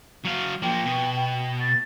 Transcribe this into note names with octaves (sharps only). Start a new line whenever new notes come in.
F#3 F5
F3 A#3 G5
B2
G5
A6